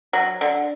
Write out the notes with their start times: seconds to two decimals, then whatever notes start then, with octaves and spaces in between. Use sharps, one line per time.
0.13 F#3
0.41 D3